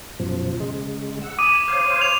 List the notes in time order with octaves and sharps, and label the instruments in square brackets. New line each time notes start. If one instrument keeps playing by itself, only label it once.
[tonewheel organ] F#2 B2 F3
C#3 G#3
F#5 E6
[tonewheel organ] G#5 B5 [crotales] D6 D#6 D#7
[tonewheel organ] C5 C#5 F5
[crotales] F7